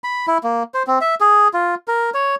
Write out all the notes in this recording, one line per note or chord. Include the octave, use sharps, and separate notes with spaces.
B5
E4
A#3
C5
C4
E5
G#4
F4
A#4
C#5